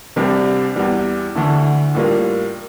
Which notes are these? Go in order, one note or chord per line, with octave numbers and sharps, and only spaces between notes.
C2 C3 G3 D4
E2 E3 G3
D2 D3 A3 E4
A2 G3 A#3 F4